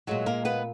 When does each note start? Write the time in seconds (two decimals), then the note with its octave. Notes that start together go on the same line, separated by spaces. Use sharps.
0.07 A#2 F#3 G#3 F#4
0.26 A#3 A#4
0.45 B3 B4